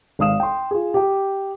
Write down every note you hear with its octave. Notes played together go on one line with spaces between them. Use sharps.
G#1 F5 D#6 E7
G5 C6
F4 G#4
G4 G5